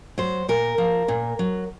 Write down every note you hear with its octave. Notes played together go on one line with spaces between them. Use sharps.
F#3 C5
A#2 A#4
F3
A#2
F#3